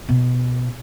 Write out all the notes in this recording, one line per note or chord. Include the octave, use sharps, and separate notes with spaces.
B2